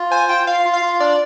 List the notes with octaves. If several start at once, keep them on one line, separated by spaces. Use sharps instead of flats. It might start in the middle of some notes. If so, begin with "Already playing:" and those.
Already playing: F4
C5 G#5
F4 G5
F4 F5
F4
F5
F4
D4 D5